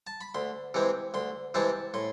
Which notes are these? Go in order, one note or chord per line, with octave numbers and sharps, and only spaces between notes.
A5
B5
D2 C6
C3 E3 G#3 C4
D2 C6
C3 E3 G#3 C4 A5
A2 C6